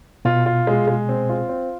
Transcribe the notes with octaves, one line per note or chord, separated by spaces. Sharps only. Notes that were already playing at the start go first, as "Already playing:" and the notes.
B2 F4
F4
G#3
G#3
C4
F4
C4